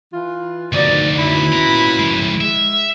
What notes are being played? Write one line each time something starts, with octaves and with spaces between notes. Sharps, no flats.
E3 F4
D2 B2 D#3 F3 D#4 D5
B2 C#4 E4 B5
F4 A#5
F3 G#3
G#3 E5